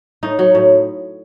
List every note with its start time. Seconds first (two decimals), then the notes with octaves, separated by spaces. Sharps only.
0.23 A2 D#4
0.39 F#3
0.55 A2